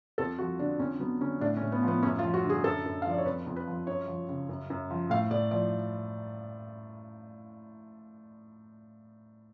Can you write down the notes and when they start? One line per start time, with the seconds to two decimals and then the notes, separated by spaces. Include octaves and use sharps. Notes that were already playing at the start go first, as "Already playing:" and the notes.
0.18 F2 A4
0.38 F3 F#4
0.59 D3 D4
0.79 F2 C#4
1.00 F#3 B3
1.21 D3 C#4
1.41 A2 D4
1.57 C#4
1.62 A2
1.72 B3
1.83 F3 B3
2.03 F#2 C#4
2.19 F4
2.24 F3
2.34 F#4
2.44 D3
2.50 G#4
2.64 F#2 A4
2.85 F#2
3.02 F5
3.05 F3 D5
3.18 C#5
3.26 F2 B4
3.46 F2
3.56 B4
3.67 F3
3.87 F#2 C#5
4.08 F3
4.29 C#3
4.49 F#2
4.70 F#2
4.90 F3
5.10 A2 F5
5.31 A2 D5
5.51 F3 D5